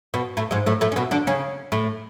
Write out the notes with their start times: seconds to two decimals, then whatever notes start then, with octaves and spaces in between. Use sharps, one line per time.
0.14 B2 B3
0.37 A2 A3
0.51 G#2 G#3
0.66 A2 A3
0.81 A2 A3
0.92 C#4
0.96 B2 B3
1.11 D3 D4
1.27 C#3 C#4
1.72 A2 A3